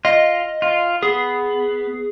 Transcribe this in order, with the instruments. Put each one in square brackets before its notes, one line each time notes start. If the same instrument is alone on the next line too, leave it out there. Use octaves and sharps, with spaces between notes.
[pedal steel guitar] F4 [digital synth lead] D#5
[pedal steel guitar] F4
[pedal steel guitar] B3 [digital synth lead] G#4